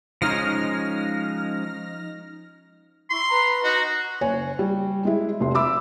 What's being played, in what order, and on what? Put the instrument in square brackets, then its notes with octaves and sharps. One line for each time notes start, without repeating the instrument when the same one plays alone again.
[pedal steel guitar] F3 G#3 C#4 [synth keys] D#4 F6 A#6
[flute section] E4 C#6 [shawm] C6
[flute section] B4 A#5
[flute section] D#4 D#5 [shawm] F#4
[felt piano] F#1 C#5 G#5
G3
G#3 E4
F1 C3 C6
E5 B5 D6 E6